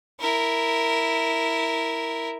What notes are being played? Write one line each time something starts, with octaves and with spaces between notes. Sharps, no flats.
E4 A#4